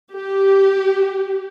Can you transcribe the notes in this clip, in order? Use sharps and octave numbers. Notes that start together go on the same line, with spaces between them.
G4